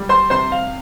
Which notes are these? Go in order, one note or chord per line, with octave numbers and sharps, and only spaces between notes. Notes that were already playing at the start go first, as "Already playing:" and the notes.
Already playing: G3
C5 C6
C3 C5 C6
F5